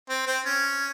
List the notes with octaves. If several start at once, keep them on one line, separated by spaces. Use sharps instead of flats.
C4
C4
C#4